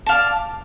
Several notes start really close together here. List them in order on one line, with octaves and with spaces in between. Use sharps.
A5 F5 D5